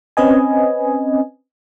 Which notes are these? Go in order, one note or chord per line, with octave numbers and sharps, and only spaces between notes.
C4 C#4 B4 D#5 G#5